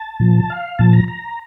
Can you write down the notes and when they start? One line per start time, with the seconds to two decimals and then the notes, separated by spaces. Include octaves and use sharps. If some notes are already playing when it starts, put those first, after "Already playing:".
Already playing: A5
0.20 A#2 F3
0.50 F5
0.79 A#2 F3 A5
0.93 A#5
1.08 A#5